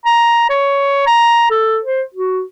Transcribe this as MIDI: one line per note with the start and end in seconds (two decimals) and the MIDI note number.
0.06 0.49 82
0.50 1.04 73
1.07 1.50 82
1.51 1.79 69
1.85 2.03 72
2.14 2.42 66